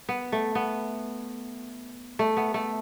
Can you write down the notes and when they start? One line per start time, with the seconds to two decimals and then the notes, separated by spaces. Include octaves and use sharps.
0.09 B3
0.32 A3
0.55 B3
2.19 A3
2.37 B3
2.54 A3